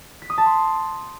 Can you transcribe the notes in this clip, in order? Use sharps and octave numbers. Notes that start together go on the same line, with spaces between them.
B6
D#6
A5
C6